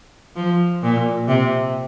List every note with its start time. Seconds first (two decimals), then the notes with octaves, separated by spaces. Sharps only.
0.36 F3
0.83 A#2
1.28 C3